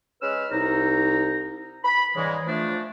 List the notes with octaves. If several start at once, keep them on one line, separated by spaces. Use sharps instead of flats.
G#3 C#4 B4 E6 F6
C2 D#4 A#5
B5
G#2 C#3 E3 G3 G#3
F3 A3 D4